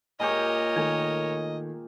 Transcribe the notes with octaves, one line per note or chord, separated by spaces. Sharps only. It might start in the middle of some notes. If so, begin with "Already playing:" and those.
A#2 G#3 G4 A#4 C#5 D#5 G#5
D#3 A3 G#5